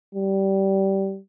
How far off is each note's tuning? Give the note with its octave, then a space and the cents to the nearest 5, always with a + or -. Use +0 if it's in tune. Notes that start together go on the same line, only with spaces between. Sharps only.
G3 -15